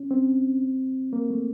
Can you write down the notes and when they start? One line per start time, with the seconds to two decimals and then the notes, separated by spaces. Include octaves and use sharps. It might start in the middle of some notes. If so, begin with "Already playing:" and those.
Already playing: C#4
0.11 C4
1.13 A#3
1.30 A3